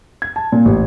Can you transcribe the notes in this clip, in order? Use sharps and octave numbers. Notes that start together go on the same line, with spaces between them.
G#6
A5
A#2
A1